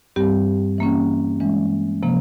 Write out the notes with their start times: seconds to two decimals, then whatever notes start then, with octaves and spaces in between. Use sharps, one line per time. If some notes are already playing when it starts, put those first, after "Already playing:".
0.16 G2 G3 C4 G4
0.78 E3 A#3 C#4
1.40 E3 G#3 C#4
2.03 C3 F3 A#3